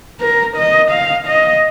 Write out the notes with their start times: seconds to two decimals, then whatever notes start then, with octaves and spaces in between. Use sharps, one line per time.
0.21 A#4
0.57 D#5
0.91 F5
1.27 D#5